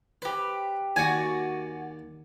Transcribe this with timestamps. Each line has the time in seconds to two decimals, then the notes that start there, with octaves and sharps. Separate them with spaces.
0.22 G4 B4 C5
0.96 D#2 A#3 F#4 D5 G#5